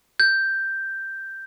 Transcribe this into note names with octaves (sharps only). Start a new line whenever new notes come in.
G6